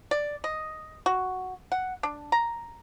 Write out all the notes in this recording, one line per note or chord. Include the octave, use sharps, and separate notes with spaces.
D5
D#5
F#4
F#5
D4
A#5